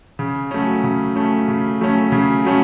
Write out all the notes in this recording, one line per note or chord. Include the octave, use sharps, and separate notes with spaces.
C#3
F#3 A3 C#4
C#3
F#3 A3 C#4
C#3
F#3 A3 C#4
C#3
F#3 A3 C#4